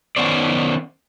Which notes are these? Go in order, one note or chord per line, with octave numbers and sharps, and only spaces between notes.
D#3 B3 C#4 C5 D5